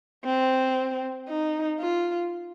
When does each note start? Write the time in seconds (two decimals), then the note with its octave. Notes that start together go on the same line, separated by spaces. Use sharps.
0.25 C4
1.28 D#4
1.79 F4